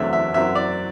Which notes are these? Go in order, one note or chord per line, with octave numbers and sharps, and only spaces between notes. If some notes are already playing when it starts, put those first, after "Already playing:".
Already playing: E2 D3 F#3 A3 C4 E5
E5
F#2 F#3 C4 E5
D5